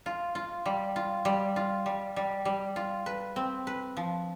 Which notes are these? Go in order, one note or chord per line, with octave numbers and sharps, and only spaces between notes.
F4
F4
G3
F4
G3
F4
G3
G3
G3
F4
B4
C4
B4
F3